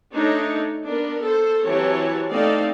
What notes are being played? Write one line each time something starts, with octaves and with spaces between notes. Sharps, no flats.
A3 D4 D#4 C#5
B3 D4 A#4
A4 C5
E3 F#3 C4 G4 C#5 A5
A3 C4 D#4 A4 D5 F5